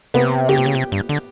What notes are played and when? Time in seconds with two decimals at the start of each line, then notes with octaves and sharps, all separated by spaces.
0.14 C3 B3
0.49 C#3 G4
0.58 C3
0.66 C#3
0.75 C3
0.92 G2
1.09 D3